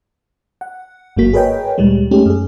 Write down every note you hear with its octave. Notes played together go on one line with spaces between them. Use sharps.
F#5
G1 G#2 F#3 A#3 F#4 B6
G#4 A#4 B4 C#5 D#5 G5
D2 A#2 G3 G#3
G#3 A3 C#4 D#4 G4 G#4
F#2 G#4